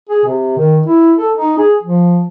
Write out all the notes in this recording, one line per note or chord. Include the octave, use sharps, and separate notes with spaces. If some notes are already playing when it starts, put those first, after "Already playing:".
G#4
C3
D#3
E4
A4
D#4
G#4
F3